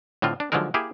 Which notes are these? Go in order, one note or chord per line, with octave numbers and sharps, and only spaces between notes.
A2 D3 C4 F4
D4
D3 F3 F#3 G#3 D#4 A#4
A#3 E4 G4 G#4